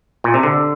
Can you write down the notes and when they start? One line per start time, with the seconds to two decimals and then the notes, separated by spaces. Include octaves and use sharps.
0.24 A#2
0.34 C3
0.43 D3